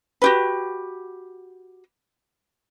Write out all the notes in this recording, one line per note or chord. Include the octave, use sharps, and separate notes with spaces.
F#4 G4 B4